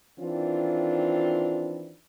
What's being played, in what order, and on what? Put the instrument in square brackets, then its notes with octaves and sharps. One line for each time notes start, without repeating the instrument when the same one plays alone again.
[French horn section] D#3 E3 C4 D4 F4